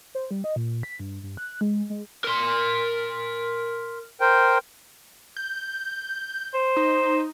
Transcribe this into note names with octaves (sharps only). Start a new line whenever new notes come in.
C5
G3
D#5
A#2
B6
G2
G2
F#6
G#3
G#3
A#4 C6
A#4 C5 G5
G6
C5
D#4